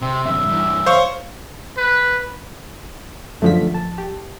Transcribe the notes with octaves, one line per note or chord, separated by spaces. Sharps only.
C3 C4
F#2 D#3 E5
G2 E3
C5 C#5 F5 C#6
B4
F#2 D3 F3 A3 B6
A5
G4